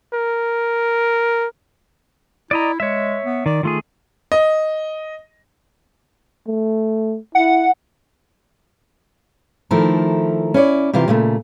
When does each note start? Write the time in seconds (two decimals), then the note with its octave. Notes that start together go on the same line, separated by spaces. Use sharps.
0.14 A#4
2.51 E4 D5 D#5 A#5
2.80 G#3 C#5 E5
3.24 B3
3.46 D#3 D5
3.63 D#3 A3 F4 G#4
4.32 D#5
6.47 A3
7.35 E4 F#5
9.71 D#3 F3 A3 E4 A4 A#4
10.54 C#4 E4 C#5 D5
10.93 C3 E3 F4 G4 A#4
11.08 A#2 C#3 A3